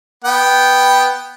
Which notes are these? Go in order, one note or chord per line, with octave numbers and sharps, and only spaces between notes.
B3 G5